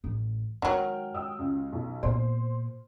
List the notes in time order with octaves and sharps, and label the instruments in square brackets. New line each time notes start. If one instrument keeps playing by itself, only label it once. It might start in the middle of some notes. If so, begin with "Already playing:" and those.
[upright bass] A1
[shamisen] D#3 F#3 [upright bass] G#3 [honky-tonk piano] G5 F6
[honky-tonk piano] G5 D#6 E6
C#2
B1
[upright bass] A#2 B3 [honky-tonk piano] C5 C6